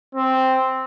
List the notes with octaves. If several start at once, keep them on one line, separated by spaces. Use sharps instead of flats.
C4